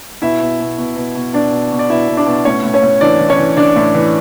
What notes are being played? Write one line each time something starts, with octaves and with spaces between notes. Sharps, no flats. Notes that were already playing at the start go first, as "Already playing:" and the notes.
B2 E4 E5
B2
B2
B2
B2
B2
B2 D4 D5
B2
B2
D5
B2 E4 E5
B2
D4 D5
B2
A2 C#4 C#5
A2
C#4 C#5
A2
E3 D4 D5
E3
C#4 C#5
E3
E3 D4 D5
A2
E3